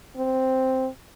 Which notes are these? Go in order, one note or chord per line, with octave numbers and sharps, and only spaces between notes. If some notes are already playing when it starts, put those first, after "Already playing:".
C4